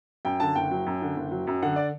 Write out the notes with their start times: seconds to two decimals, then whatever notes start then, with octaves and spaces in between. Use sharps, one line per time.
0.25 F#2 G5
0.40 D3 A5
0.55 F#1 G5
0.71 F#3
0.86 F#2
1.02 D3
1.17 F#1
1.32 F#3
1.47 F#2
1.62 D3 F#5
1.76 D5